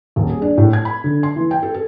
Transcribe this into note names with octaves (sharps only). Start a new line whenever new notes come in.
D#1
G#4
D4
A2
G#6
B5
D3
C6
E3
G5
A4
A4